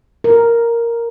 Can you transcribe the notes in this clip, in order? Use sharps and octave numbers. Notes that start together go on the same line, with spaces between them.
A#4